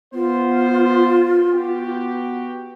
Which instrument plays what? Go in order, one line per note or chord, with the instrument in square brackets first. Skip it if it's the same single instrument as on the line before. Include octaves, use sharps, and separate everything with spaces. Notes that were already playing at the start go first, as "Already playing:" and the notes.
[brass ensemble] B3 C5 [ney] F4
[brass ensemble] B3 F#4 G4